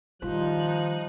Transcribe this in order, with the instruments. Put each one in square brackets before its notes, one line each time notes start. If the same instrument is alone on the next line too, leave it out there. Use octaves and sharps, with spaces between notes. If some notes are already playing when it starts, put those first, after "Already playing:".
[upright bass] D#3 [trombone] F3 [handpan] G3 F4 C5 [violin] D#4 F#6